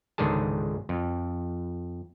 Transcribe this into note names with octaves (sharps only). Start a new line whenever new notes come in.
C#2 G#2 D3 D#3 G#4 A5
F2